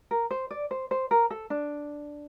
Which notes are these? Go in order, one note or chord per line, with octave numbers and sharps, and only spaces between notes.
A#4
C5
D5
C5
C5
A#4
A4
D4